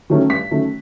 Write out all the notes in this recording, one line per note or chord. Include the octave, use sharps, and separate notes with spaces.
D#3 F#3 A3 C#4
G2 B6
D#3 F#3 A3 C#4